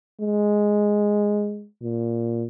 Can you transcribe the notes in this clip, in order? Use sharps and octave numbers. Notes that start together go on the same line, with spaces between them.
G#3
A#2